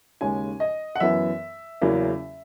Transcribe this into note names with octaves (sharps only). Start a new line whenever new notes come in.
D#2 C#3 G#3 C#4 G#5
D#5
F#5
F#2 E3 B3 E5
E2 C#3 F#3 A#3 C#4